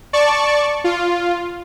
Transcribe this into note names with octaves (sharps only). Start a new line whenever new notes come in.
D5 A5 C#6
F4